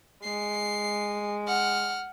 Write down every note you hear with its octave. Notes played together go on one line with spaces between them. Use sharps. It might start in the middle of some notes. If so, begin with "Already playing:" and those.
G#3 C7
F#5 F6